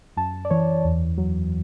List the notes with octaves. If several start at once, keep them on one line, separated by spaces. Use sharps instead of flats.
F#2 A5
D5
E3 C#5
E2
F#3